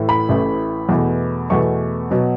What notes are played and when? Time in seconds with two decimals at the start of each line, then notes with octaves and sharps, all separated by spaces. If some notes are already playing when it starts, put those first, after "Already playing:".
Already playing: A2 E3 A3
0.09 B5
0.29 A1 A2 E3 A3
0.89 E2 B2 A3
1.50 E2 B2 A3 C#6
2.11 B2 F#3